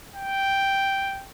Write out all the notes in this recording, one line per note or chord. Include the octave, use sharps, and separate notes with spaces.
G5